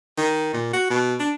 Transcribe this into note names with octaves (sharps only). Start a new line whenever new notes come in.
D#3
A#2
F#4
B2
D4